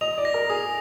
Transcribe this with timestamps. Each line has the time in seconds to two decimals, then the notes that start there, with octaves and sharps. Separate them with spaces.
0.01 D#5 F7
0.18 D5
0.25 A#6
0.34 A#4
0.50 G#4 D#6